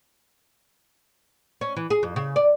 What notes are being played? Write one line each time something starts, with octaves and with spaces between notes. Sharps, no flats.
C#4
E3
G#4
F2
C#3
D5